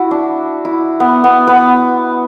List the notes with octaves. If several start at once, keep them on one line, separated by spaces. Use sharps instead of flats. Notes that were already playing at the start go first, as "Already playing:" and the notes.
Already playing: E4 F#4
D4
E4
B3
B3
B3